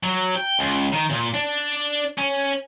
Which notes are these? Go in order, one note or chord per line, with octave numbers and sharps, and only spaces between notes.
F#3
G5
C#2
D#3
A#2
D4
C#4